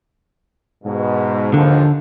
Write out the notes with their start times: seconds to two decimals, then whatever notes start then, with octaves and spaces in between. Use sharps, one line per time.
0.84 G#2 B2
1.54 D#2 G#2 D3 F3